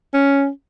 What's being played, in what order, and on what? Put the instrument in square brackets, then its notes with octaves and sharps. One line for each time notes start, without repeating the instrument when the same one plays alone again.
[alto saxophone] C#4